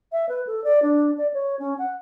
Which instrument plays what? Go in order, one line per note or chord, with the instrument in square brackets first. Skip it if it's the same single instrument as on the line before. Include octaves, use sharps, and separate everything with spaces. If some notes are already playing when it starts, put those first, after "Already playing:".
[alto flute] E5
B4
A4
D5
D4
D5
C#5
C#4
F#5